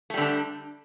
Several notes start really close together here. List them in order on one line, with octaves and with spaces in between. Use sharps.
A3 G3 D3 D4